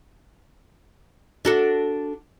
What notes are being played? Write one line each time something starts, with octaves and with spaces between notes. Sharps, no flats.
D4 F#4 A4